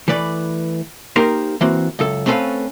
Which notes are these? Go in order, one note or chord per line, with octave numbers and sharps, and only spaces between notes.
E3 A3 B4 D5
A#3 D#4 G4 A#4 C5
E3 A#3 C4 F#4
C#2 F#2 A4
A3 C4 C#4 A4 B4 F5